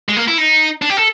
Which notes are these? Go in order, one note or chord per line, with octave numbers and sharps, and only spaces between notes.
G#3
A#3
E4
D#4
D4
G4
A4